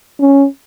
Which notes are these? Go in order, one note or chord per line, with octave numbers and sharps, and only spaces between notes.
C#4